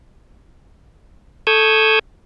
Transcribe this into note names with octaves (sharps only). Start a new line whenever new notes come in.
A4 C#6 D#6 E6 G6 G#6